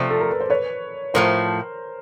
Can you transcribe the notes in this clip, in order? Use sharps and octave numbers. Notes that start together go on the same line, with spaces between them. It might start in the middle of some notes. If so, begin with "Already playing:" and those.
Already playing: C3 F3 A3 C5 D5
A4
A#4
B4
C5
B4 C#5
A2 F3 A3 A#4 C5